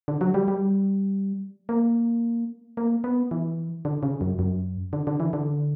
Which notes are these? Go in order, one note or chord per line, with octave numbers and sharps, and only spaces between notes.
D3
F#3
G3
G3
A#3
A#3
B3
E3
D3
C#3
F#2
F#2
D3
D3
E3
D3